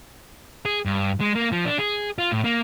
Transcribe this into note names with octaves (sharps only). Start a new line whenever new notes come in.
G#4
G2
G#3
A#3
F3
D4
G#4
F4
A2
A#3